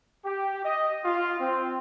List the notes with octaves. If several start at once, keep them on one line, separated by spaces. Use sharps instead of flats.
G4
D#5
F4
C4